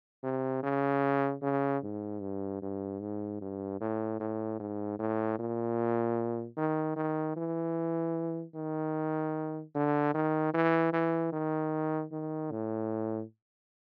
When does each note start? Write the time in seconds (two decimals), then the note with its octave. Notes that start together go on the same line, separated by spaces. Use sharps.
0.23 C3
0.63 C#3
1.42 C#3
1.83 G#2
2.21 G2
2.62 G2
3.01 G#2
3.41 G2
3.81 A2
4.20 A2
4.60 G#2
4.99 A2
5.39 A#2
6.57 D#3
6.96 D#3
7.36 E3
8.55 D#3
9.75 D3
10.14 D#3
10.54 E3
10.93 E3
11.33 D#3
12.12 D#3
12.51 A2